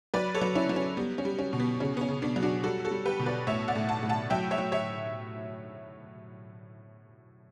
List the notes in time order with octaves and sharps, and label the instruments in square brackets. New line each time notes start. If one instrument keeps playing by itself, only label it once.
[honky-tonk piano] F#3 B4 D5
A4 C#5
F#3
C#4 E4
F#3
C#4
G3 B3
C#4
G3
C#4
B2
B3
C#3 C#4
B3
C#4
C#3
B3 D4
F#3
D4 F#4
G3 F#4 A4
F#4 A4
G3
G4 B4
B2
B4 D5
A2 C#5 E5
D5 F#5
A2
F#5 A5
A2
F#5 A5
F#3 E5 G5
C#5 E5
F#3
C#5 E5